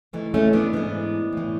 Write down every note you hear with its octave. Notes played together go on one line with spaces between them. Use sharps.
G#2 E3 A3
A3 C#4
B3 D4
G#2 E3 B3 D4
A2 E3